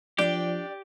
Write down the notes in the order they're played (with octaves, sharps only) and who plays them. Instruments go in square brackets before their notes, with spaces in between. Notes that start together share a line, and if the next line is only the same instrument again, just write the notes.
[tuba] F3 [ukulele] D4 [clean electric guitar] G4 [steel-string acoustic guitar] D5 G5